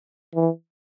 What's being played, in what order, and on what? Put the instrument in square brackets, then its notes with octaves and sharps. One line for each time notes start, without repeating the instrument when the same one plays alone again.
[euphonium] E3